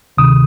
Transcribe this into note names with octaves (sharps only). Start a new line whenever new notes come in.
D2 C3 D#3 D#6